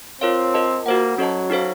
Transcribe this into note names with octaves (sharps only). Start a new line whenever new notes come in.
C4 F4 A#4 C#5 F5
F4 A#4 D#5 A5
A#3 F#4 C5 F#5
F#3 C#4 F#4 A4 D#5 A5
D#4 F#4 A4 C5 F5